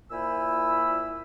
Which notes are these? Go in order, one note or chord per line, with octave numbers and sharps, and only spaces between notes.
A#2 E4 C5 G#5 B5 E6